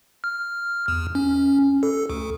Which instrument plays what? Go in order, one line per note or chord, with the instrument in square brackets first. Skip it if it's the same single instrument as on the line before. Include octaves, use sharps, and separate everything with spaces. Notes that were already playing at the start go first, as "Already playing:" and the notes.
[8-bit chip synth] F6
E2
C#4
A4
D2